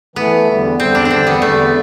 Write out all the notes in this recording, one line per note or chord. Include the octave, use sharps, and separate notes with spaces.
E3 A3 B3 E4
E2 D3 G3
E2 D3 G3 C4
D4
D4
E2 D3 G3 C4
B3
E2 D3 G3 A3